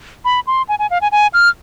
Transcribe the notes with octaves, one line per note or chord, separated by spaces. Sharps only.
B5
C6
G#5
G#5
F5
G#5
G#5
F6